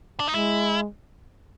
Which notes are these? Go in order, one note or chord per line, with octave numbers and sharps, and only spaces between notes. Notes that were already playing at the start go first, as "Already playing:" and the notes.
D4
D#4
G#3 E4